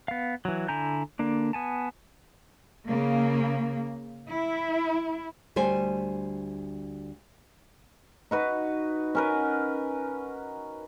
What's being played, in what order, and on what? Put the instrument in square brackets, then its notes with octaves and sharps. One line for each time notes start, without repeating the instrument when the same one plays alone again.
[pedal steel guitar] B3 F5
E3 F#3
D3 E4 G#5 A#5 G6
D3 A#3 D4
B3 G#5 A5
[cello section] C#3 A#3
E4
[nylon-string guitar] D2 G3 C5 G#5
[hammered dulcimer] D#4 F#4 B4
C#4 A#4 B4